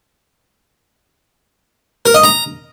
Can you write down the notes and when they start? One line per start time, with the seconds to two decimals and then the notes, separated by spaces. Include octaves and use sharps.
2.06 A#4
2.15 D#5
2.23 A#5